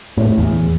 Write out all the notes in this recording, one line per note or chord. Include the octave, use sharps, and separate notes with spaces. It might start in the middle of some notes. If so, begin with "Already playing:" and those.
A2
A2
E2